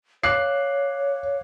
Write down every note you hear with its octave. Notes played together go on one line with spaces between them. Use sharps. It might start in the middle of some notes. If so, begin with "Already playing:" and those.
C#5 F5 D6 F#6 C7